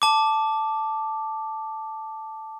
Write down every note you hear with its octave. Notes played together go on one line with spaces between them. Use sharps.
A5 D6